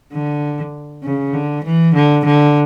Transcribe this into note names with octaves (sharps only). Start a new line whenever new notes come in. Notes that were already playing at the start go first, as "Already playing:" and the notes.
D3
C#3
D3
E3
D3
D3